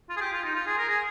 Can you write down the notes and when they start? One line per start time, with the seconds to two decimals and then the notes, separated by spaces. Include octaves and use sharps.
0.09 F4
0.17 G#4
0.21 G4
0.32 F4
0.44 D#4
0.55 F4
0.66 G#4
0.77 A#4
0.89 G#4